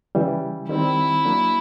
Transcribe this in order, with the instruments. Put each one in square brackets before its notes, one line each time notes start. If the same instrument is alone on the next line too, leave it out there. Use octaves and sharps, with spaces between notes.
[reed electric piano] C#3 E3 G3
[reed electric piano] D#3 G3 C4 [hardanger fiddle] E4
[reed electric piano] F#3 A#3 D4